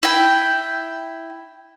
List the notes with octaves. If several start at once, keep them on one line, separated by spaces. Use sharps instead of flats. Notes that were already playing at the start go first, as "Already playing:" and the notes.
E4 G5